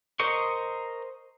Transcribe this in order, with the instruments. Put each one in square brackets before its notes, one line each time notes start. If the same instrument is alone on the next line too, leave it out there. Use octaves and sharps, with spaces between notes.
[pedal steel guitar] A#4 C5 D#5 C#6